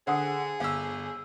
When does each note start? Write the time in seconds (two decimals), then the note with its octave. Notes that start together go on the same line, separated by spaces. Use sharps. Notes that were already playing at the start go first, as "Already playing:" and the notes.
0.07 D3 G#4 C5 F#5 D#6
0.60 G1 F5 E6